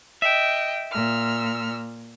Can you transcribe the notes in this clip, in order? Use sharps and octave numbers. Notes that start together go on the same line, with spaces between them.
D#5 E5 G5
A#2 E6 F6